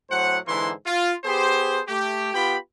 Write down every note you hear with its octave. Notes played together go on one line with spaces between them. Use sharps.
A2 F#3 C5 F#5
G#2 D3 E3 A#3 E4 C6
F4
B3 G4 G#4 C5
A3 G4
B3 F4 G4 G5 B5